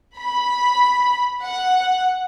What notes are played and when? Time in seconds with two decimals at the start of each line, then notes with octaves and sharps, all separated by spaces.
0.19 B5
1.43 F#5